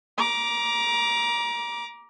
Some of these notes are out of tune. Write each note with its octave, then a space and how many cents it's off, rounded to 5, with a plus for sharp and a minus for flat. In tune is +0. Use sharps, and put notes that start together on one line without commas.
A#5 +25 D6 -5